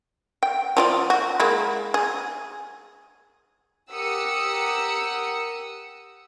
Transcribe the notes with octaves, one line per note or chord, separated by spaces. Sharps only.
G5
F3 F4 D5
F#4
G#3 A#3 E4
G#4
G4 A#4 F#5 D#6 E6 C#7